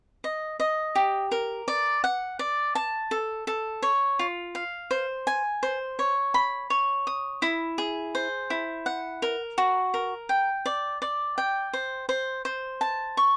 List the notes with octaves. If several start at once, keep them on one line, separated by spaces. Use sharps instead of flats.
D#5
D#5
G4
A#4
D5
F#5
D5
A5
A4
A4
C#5
F4
F5
C5
G#5
C5
C#5
B5
C#5
D#6
E4
G#4
C5
E4
F#5
A#4
F#4
A#4
G5
D5
D5
G5
C5
C5
C5
A5
C#6